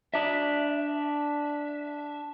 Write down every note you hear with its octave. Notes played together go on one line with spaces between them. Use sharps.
D4 E5